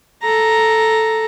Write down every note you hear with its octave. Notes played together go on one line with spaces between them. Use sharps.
A4 A#5